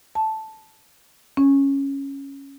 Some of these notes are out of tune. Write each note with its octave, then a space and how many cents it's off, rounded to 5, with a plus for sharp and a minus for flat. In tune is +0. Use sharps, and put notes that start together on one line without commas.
A5 -5
C#4 -5